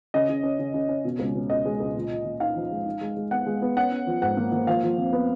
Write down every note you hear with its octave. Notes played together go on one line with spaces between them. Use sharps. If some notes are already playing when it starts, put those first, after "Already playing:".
C#3 D#5
C#3
C#4
C#3
C#3
C#4
B2
C#2
B2
C#2 D#5
G#3
C#2
A#2
A#2
A#2
D#4 F5
F3
G#3
D#4
G#3
G#3
B3 F#5
G#3
B3
C#4 F#5
C#4
F3
G#2 F#5
A#3
A#3
F3 F5
F3
F2
B3